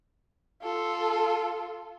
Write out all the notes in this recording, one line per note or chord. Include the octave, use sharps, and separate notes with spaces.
F4 A4